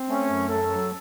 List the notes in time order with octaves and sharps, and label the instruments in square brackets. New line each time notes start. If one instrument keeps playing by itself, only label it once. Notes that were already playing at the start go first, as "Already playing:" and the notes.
Already playing: [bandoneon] C4
[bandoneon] A3 [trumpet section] C#4
[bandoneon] F#2
[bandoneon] F#3 [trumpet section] A4
[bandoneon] F#3